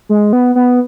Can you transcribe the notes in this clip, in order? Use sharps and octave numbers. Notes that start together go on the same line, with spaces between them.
G#3
B3
B3